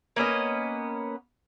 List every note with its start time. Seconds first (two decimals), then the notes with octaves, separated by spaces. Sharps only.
0.16 A#3 B3 C#4 D#5